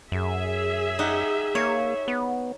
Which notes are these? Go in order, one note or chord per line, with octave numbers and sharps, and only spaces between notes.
F#2 G#4 E5
D#4 G4 F#5
A#3 C#5
B3